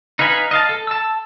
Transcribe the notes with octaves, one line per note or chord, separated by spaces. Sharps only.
D#4 B4 F5 G#5 B5
D#5 F5 A5
A4
A5 E6